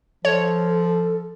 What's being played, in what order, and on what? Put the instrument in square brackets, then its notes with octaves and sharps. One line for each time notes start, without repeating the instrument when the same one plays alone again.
[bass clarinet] F3 [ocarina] A4 [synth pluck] C#5